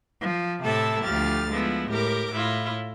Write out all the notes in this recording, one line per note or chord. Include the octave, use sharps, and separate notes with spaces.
F3
A2 C3 E4 A4 A5 E6
D2 F3 G4 F6 A6
F3 G#3 B3 E4
A2 G4 A#4 D6
A2 E4 F4